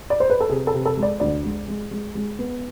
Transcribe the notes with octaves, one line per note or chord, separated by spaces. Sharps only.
D5
C5
B4
A4
C3 G#4
A4
C3
A4
G#3
D5
D2 D5
G#3
G#3
G#3
G#3
B3